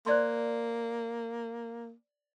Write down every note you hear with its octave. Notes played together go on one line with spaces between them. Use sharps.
A#3 C5 D5 C6